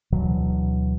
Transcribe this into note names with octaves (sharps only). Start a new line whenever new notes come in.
D2 B2 E3 F#3